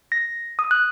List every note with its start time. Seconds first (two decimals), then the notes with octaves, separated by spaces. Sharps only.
0.12 A#6
0.59 D#6
0.71 F#6